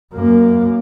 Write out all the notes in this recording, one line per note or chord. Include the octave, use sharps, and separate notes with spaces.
F#2 A#3